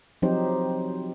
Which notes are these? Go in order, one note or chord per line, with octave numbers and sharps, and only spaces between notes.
F3 F#3 C4 D#4 G4 C5